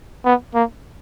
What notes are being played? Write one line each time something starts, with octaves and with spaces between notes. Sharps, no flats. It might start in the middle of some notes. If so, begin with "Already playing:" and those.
B3
A#3